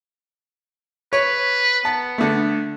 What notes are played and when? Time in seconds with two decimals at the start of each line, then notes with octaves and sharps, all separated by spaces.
1.13 B4 C#5
1.85 B3 A5
2.18 D3 A3